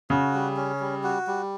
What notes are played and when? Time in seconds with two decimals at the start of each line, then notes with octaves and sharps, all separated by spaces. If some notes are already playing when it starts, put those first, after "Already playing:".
0.10 C#3 F#4
0.34 G3
0.57 C#4
0.80 G3
1.03 F#4
1.27 G3